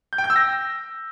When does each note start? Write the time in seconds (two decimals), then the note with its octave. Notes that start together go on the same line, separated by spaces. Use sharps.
0.13 G6
0.18 G5
0.24 G6
0.30 E6
0.36 A#6